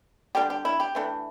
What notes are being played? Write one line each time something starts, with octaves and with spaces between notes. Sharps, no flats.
D3 G3 D4 G4
G4
E4
G4
E3 A3 D4